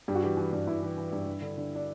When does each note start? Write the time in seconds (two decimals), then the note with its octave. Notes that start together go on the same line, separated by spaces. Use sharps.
0.08 G2 G4
0.15 F#4
0.23 E3 G4
0.37 E3
0.53 G2
0.67 G2 E4
0.83 E3
0.97 E3
1.13 G2
1.27 G2
1.42 D3
1.58 D3
1.75 D4